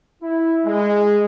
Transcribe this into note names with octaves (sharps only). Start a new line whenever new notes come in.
E4
G#3